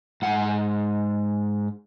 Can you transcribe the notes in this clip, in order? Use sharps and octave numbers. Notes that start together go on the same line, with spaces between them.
G#2 F#5